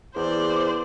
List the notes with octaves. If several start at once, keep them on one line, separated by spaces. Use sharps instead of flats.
E2 C5 D5